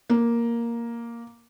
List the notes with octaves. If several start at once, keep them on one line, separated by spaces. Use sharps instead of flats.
A#3